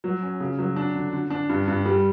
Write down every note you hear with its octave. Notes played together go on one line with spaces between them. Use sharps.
F#3
C#4
C#3
F#3
D4
D3
D3
D4
G2
G2
G3